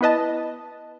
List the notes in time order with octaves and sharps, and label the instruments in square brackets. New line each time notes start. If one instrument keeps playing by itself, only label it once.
[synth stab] B3 E4 B4 D#5 A5